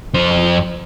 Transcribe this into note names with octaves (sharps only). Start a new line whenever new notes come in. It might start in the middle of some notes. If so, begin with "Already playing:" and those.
F2 C5